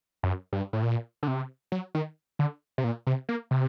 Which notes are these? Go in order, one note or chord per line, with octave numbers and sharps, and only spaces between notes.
F#2
G2
A2
A#2
D3
C3
F#3
D#3
D3
C3
A#2
C3
A#3
C3